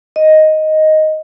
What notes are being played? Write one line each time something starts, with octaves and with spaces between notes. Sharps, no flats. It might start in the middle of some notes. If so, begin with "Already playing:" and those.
D#5